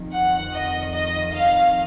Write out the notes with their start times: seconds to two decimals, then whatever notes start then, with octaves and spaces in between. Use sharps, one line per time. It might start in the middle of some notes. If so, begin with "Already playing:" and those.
Already playing: F2 D#3
0.13 F#5
0.54 D#5
0.94 D#5
1.33 F5